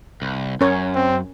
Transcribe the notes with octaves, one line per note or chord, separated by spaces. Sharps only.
C2
F#2 C#4 A#4 C#5
C4